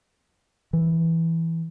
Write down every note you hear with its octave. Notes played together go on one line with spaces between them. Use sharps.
E3